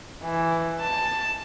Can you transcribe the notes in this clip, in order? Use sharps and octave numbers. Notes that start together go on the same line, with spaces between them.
E3
A5